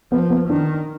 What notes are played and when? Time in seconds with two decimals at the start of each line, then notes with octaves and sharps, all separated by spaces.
0.12 F3 B3
0.30 B3
0.49 D#3 D4